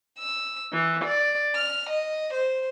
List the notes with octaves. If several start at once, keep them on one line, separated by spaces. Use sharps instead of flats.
E6
E3
D5
F6
D#5
C5